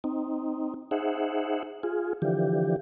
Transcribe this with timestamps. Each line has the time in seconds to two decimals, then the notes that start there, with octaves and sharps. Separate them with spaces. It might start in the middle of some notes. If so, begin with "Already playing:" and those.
0.04 C4 D#4
0.91 D#4 G#4 C5 E5 F#5
1.83 F4 G#4
2.22 D3 E3 F3 G4